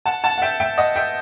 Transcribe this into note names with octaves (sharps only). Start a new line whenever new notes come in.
F#5 A5
F#5 A5
F#5
E5 G5
E5 G5
D#5 F#5
E5 G5